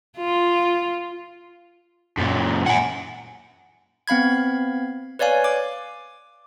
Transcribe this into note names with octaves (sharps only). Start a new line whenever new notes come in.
F4
F#2 A#2
F#5 G#5
B3 C4 F5 B5 G#6
B4 C#5 D5 F5 G#5
D6